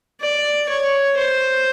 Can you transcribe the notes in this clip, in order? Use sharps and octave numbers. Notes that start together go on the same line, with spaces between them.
D5
C#5
C5